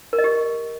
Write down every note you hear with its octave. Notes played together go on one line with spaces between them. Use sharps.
A#4
D#5
G4